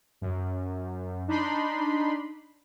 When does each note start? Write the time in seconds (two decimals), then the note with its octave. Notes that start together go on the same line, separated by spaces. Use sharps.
0.21 F#2
1.28 D4 D#4 B5 C6